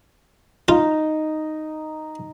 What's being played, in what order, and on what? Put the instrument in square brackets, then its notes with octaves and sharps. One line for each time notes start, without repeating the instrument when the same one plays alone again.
[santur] D#4 [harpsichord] F4